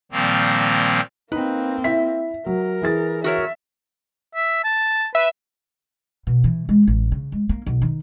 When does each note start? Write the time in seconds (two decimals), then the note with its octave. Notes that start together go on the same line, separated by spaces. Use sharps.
0.12 A#2 D#3 F3 G3 A#3 C4
1.32 A#3 C4 D#4 B4
1.84 E4 E5 B6
2.46 F#3 A#4
2.82 E3 G#4 A6
3.24 F#4 A#4 C#5 E5
4.35 E5
4.64 A5
5.15 B4 E5
6.27 B2
6.44 E3
6.69 G#3
6.87 A1
7.12 C#3
7.32 G#3
7.49 A#3
7.66 B1
7.82 D#3